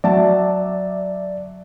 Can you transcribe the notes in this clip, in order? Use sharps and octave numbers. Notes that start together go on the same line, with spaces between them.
F#3 D5 E5 A5